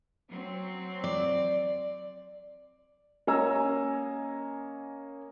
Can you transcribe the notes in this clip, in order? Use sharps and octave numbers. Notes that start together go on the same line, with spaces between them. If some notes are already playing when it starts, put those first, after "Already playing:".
F#3 C4
D5
A#3 C#4 D#5 G#5 A#5 E6